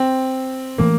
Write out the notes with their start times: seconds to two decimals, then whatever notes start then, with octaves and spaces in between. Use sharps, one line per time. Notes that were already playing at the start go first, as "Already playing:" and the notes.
Already playing: C4
0.78 E3 A3 A#3 D4